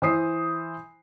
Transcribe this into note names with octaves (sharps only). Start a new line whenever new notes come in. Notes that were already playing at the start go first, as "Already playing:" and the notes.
E3 C5 D#6 C7